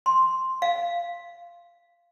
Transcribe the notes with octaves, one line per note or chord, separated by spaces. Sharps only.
C6
F5